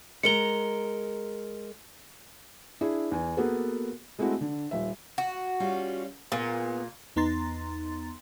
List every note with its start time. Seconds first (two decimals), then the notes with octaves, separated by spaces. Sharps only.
0.23 G#3 A#4 A#5 C#7 G7
2.81 D4 E4 G#4
3.11 E2 G#5
3.37 A#3 B3 F#4 G#4 A4 B4
4.19 G#3 A3 C4 E4 F#4
4.41 D3
4.71 D#1 E5
5.18 F#4
5.60 G3 C#4 F4
6.32 A#2 B3 G#4
7.16 E2 B3 D#4 A#5 C6 A6